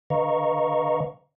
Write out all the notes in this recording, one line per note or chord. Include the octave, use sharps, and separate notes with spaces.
D3 B4 D#5 F5 A#5 C#6